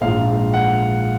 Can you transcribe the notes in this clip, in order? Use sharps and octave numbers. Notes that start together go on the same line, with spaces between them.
A#1 G#2 F3 F5
F#5